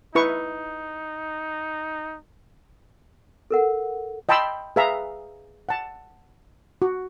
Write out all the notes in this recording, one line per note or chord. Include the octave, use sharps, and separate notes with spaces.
D#4 E4 B4 C#6
A4 A#4 F#5
D#5 G5 A5 B5 C6 E6
G#4 B4 E5 F5 A#5
F#5 A5
F#4